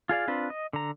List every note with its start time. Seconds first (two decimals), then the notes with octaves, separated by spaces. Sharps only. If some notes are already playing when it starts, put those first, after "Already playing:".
0.09 F4 G#4 D5 F5
0.28 C4 D4 F4 B4
0.50 D#5
0.73 D3 A#5